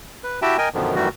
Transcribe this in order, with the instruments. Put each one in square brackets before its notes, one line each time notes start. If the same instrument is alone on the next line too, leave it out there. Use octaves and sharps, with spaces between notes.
[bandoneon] B4
E4 F#4 G4 E5 G5 A5
A#4 D#5 G5 G#5
F#2 B2 D3 D#3 F3
F#2 D#3 E3 G3 A3 F#4